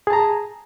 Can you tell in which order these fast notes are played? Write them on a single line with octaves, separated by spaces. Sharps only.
G#4 A5 A#5